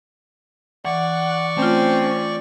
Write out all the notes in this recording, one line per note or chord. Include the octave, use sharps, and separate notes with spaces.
E3 D5 F#5 C#6
A3 C4 C#4 F4